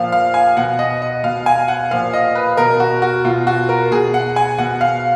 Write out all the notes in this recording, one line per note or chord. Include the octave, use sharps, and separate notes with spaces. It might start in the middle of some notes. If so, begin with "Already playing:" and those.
Already playing: A#2 F3 F5
F5
G#5
B2 F#5
D#5
D#5
B2 F5
G#5
F#5
A#2 F3 F5
D#5
B4
B2 A#4
F#4
F#4
B2 F4
F#4
A#4
B2 G#4
F#5
G#5
B2 F#5
F5